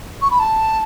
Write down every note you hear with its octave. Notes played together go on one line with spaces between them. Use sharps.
C#6
B5
A5